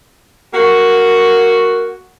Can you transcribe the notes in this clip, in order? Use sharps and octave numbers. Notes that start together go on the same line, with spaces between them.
A#3 F#4